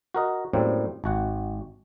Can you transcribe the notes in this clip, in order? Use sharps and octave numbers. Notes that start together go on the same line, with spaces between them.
F#4 A#4 D#5
F#2 A2 G3 A#3 C4
G#1 F#4 F#5